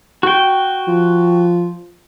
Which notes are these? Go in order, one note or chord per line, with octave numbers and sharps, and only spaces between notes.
F#4 G5
F3